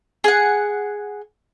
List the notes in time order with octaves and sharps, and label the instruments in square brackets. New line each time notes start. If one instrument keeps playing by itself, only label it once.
[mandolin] G#4 F#5